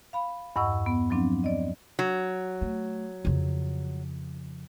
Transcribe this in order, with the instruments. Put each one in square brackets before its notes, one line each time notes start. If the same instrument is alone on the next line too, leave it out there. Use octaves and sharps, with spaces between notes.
[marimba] F5 B5
E2 G2 D#5 F#5 C#6 E6
B3
F3 F#3 C4 D4
D5 D#5
[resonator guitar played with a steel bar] F#3
[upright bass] A3
F2 C#3